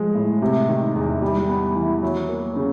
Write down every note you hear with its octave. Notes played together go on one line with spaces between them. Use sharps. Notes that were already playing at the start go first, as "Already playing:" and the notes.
Already playing: F3 G#3
A2
C3
D#3
E2
G3
B3
E3
F#3
A#3
C#3